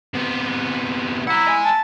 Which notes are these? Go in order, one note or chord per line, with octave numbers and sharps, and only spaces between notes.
C3 B3
E4 F#5 A#5
D#5 G#5
A5